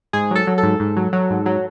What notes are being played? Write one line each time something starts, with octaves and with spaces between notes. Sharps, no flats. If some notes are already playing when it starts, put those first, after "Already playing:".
G#2 G#4
F#3 A4
F#3
G#2 A4
G#2
F#3
F#3
G#2
F#3